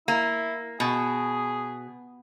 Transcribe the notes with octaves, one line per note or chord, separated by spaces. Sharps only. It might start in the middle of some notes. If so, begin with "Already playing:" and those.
A#3 E4
B2 G#4